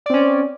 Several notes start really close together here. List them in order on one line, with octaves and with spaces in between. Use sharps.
D5 C4 C#4